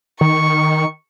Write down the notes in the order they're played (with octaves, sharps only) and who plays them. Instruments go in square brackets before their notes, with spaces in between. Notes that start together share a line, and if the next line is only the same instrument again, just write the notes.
[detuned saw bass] D#3 [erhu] C#6